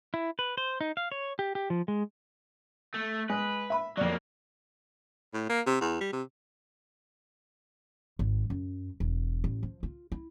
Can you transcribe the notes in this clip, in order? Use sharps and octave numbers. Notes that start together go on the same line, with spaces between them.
E4
B4
C5
D#4
F5
C#5
G4
G4
F3
G#3
A3
G#3 B4
E5 B5
F2 F#3 A#3 D5
A2
A#3
C3
E2
G3
C3
G#1
F#2
E1
A1
F3
F4
E4